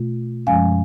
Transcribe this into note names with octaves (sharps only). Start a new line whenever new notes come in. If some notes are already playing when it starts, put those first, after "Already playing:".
Already playing: B2 A3 F4
F#2 F3 G#3 C#4 F5 G#5